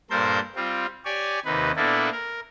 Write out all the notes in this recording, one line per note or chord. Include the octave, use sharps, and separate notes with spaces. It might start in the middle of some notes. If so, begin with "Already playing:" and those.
G2 A#2 A4 A#4 C5 G6
G3 C4 F4
G4 C#5 D5 G#5
D#2 C3 D#4 B4
A#2 A#3 B3 D4 E4 A4
A#4